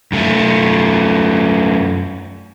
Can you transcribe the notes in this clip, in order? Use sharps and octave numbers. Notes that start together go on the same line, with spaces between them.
F#2 A3